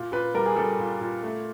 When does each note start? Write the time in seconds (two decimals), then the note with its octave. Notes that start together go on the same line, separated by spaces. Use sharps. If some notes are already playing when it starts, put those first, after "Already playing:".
Already playing: A#2
0.12 A#2 B4
0.34 G3 A#4
0.46 G#4
0.56 G3 A4
0.79 A#2
1.01 A#2
1.23 A3